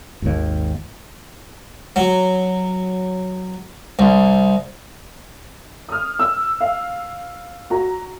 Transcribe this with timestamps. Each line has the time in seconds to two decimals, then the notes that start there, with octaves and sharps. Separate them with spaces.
0.22 G#1 D#2
1.96 F#3
3.99 C2
5.89 D#6 F6
6.19 E6
6.61 F5
7.70 F#4 A#5